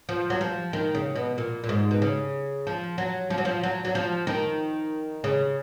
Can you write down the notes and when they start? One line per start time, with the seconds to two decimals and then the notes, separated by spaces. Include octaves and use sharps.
0.09 F3
0.30 F#3
0.41 F3
0.73 D#3
0.95 C#3
1.15 B2
1.38 A#2
1.64 A#2
1.69 G#2
1.91 B2
2.02 C#3
2.67 F3
2.98 F#3
3.30 F3
3.38 F#3
3.45 F3
3.63 F#3
3.85 F#3
3.95 F3
4.27 D#3
5.24 C#3